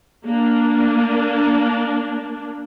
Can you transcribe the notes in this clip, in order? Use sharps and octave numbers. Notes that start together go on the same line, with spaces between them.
A#3 D4